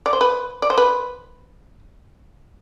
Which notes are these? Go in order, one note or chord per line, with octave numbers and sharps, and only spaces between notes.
D5
C5
B4
D5
C5
B4